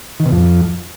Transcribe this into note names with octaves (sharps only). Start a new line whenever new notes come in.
D#3
B2
F2